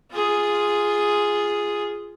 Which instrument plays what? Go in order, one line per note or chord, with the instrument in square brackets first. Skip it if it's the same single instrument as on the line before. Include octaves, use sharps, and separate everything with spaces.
[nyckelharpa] F4 G#4